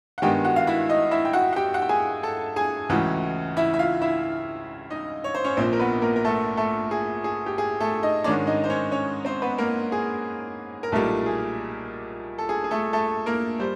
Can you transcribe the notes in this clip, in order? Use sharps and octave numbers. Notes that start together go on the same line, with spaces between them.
F#5
G2 D#3 G#3 B3 G4 G5
F#4 F#5
F5
E4 E5
D#4 D#5
E4 E5
G5
F#4 F#5
F#5
G4 G5
F#5
G5
G#4 G#5
A4 A5
G#4 G#5
C#2 C#3 E3 A3 F#4 F#5
E4 E5
E5
F4 F5
E4 E5
D#4 D#5
C#5
C5
C#4 C#5
A#1 A#2 F3 C4 C5
A#4
B3 B4
A#3 A#4
A#4
A3 A4
A3 A4
G#4
G#4
G4
G#4
A3 A4
D#4 D#5
G#2 D#3 G#3 C#4 D4 D5
D#4 D#5
C5
C#4 C#5
C#4 C#5
C4 C5
B3 B4
A#3 A#4
G#4
A#4
B1 A#2 G3 A3 A#3 A4
G#4
A4
G#4
G#4
A3 A4
A3 A4
A#3 A#4
G3 C5